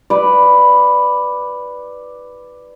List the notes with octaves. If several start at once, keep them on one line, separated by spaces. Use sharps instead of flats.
B4 D5